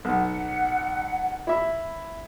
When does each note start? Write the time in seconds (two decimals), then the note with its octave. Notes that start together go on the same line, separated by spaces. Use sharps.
0.05 B1 F#5
1.47 E4 E5